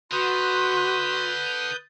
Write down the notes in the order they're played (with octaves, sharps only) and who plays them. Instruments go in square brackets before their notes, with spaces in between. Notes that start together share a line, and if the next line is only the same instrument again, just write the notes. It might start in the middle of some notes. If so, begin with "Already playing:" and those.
[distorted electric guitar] D3 [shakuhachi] F#4 [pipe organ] B4 D#6 G6 [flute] C6